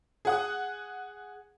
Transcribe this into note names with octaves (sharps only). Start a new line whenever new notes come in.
G#4 F#5 D#6